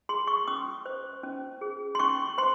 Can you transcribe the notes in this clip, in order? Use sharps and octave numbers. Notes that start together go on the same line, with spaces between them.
G#4 C6
C#6
C#4 D#6
C5
C#4
G#4
C6
C#4 C#6
C5 C6